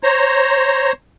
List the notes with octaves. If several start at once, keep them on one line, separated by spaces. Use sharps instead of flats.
C5 C#5 A#5